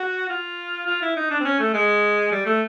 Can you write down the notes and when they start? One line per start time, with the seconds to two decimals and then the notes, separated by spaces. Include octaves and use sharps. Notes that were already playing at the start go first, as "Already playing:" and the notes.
Already playing: F#4
0.29 F4
0.87 F4
1.02 E4
1.16 D#4
1.31 D4
1.40 C4
1.45 C#4
1.59 A3
1.74 G#3
2.32 G3
2.46 A3